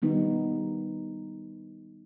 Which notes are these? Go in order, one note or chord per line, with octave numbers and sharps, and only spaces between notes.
D#3 G3 B3 D#4 B4